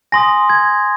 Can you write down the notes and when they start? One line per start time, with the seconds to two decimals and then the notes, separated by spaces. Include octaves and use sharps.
0.12 G#5 C6 D#6 A#6
0.50 G#6